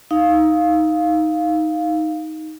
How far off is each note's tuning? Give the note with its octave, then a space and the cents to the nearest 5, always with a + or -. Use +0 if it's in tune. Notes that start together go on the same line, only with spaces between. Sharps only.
D#4 +10 F5 +0